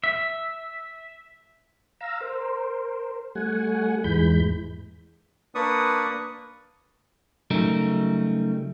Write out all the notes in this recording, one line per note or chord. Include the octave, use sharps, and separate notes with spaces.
E5
F5 A#5 E6
A#4 C5
G3 A3 F#5 G#5
E2 G#2 E3 G#3 B5 G6
A#3 D4 B4 D5 C#6 D#6
C#3 F#3 G3 A3 D#4 A#4